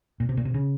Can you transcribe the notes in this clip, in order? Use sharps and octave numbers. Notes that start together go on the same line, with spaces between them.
A#2
C3
A#2
C3
C#3